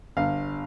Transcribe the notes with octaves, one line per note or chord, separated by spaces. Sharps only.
G1 F5